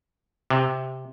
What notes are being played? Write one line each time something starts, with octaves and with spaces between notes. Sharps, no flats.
C3